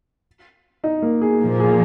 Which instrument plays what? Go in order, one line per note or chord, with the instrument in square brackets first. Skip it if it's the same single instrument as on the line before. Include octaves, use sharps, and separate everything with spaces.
[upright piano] D#4
A#3
G#4
[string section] A#2 F3 A#3
[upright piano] G#4